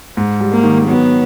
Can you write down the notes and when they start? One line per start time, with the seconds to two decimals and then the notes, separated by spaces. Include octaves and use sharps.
0.17 G#2
0.40 G3
0.52 A#3
0.64 D#3
0.88 F#3 B3